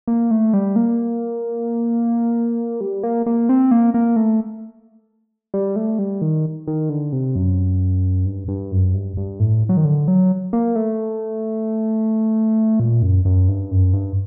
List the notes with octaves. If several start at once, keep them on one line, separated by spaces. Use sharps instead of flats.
A#3
A3
G3
A#3
G3
A#3
A#3
C4
A#3
A#3
A3
G3
A3
G3
D#3
D#3
D3
C3
F#2
G2
G2
F#2
G2
G2
A2
F#3
D#3
D3
F#3
A#3
A3
A#2
F#2
F#2
G2
F#2
G2